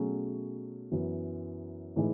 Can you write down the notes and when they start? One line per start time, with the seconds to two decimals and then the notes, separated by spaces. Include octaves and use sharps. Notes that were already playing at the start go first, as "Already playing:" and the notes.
Already playing: B2 F#3 A3 C#4 G#4
0.91 F#2 E3 B3
1.96 A2 E3 G#3 D#4 G#4